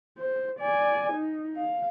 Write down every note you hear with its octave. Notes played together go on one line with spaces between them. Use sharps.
C5
D5 G#5
D#4
F5